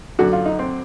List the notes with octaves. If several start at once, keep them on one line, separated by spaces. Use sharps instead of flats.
F#2 D3 F#4
F4
D#4
C4